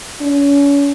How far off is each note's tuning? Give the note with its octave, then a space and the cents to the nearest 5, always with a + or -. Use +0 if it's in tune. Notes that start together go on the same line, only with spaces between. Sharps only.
C#4 +35